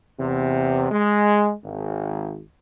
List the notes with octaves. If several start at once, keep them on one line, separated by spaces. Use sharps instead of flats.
E2 C3
G#3
G#1